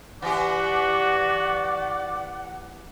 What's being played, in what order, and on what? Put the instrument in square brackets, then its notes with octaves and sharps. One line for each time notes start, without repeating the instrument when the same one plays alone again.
[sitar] E3 G4 [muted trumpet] F#4 [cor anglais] D5 [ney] F#5